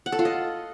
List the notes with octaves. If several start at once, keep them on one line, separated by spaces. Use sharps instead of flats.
F#5
A4
F4
D#5